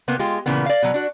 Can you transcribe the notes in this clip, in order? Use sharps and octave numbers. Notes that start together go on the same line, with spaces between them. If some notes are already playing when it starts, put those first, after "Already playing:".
C3 A#3 B3
G#3 F4 G4
A#2 C#3 E3 A#3 B3
D5 F5
B2 F#3
D4 F#4